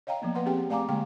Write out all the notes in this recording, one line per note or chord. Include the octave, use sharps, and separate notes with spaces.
C#5 D#5 F5 G5 A#5
F3 A#3 B3
B4 F#5 C6
C4 G4 G#4 G5
A3 D5 F5 G#5 A#5 D6
D3 G#3 A#3 G5